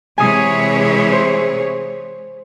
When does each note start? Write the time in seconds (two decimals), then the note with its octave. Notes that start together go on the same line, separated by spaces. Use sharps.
0.18 C3 E3 G#3 G#4 C#5 G#5 D#6
1.12 C5